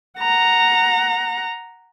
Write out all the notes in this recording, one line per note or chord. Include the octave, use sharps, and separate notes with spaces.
F#5 A#5